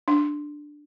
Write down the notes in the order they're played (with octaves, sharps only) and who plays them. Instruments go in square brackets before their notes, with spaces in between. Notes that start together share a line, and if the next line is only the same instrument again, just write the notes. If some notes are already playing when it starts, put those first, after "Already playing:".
[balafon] D4